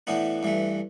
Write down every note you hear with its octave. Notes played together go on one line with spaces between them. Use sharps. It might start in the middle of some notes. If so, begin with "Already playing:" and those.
A2 E3 B3 D4
G2 E3 A3